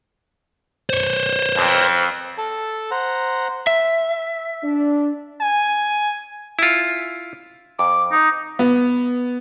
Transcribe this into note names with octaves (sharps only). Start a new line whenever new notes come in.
C5 C#5
F2
A4 A5
C5 F#5 A#5
E5
D4
G#5
E4 F4
F2 D6
D#4
B3